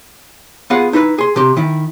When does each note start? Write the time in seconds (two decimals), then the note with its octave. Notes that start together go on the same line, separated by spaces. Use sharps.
0.70 B3 F4 G#4 F5 F#5
0.93 D#4 E4 A#4 B4
1.18 G#4 C6
1.36 C3 G4
1.57 D#3 E4